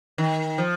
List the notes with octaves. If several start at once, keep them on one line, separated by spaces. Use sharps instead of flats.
D#3
F3